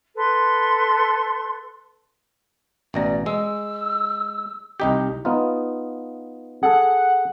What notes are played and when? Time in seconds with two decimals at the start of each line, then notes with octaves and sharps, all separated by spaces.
0.16 A4 B4 C6
2.94 A1 B2 D5 A#5
3.26 G#3 E6
4.80 C2 D#4 G4 D#5
5.25 B3 D#4 F4
6.63 G#4 A4 F#5